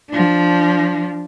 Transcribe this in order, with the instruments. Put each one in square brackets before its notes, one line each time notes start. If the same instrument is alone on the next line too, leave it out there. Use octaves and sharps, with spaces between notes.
[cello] F3 D4